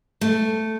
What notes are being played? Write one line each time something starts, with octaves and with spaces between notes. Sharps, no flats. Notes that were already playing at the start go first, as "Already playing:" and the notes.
A3